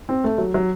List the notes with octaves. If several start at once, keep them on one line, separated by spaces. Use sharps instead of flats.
C4
A3
F#3
F#3